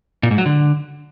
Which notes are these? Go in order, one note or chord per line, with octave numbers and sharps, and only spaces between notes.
A#2
G#2
F#3
D3